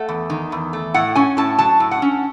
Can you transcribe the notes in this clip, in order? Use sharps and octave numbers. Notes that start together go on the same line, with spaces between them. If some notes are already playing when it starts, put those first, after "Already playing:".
Already playing: A3 F#5
E2
D#3
E2
A3
A2 F#5
C#4 G#5
A2 A5
F#3 A5
A2
F#5
C#4